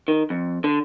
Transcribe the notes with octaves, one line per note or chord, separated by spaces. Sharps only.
D#3
F2
D3